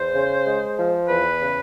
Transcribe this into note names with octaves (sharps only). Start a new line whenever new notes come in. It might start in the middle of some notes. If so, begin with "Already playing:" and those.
Already playing: E2 C5
C#3
G#3
F3
E2 B4
C#3